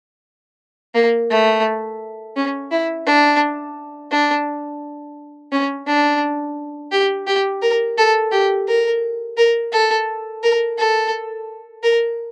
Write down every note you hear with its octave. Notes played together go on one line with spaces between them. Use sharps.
A#3
A3
C#4
E4
D4
D4
C#4
D4
G4
G4
A#4
A4
G4
A#4
A#4
A4
A#4
A4
A#4